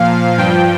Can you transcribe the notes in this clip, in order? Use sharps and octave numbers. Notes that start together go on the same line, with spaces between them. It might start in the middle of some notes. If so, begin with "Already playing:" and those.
Already playing: A#2 F3 F5
G2 F3 G5